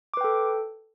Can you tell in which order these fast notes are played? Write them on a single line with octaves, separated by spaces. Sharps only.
D6 B4 G5 A4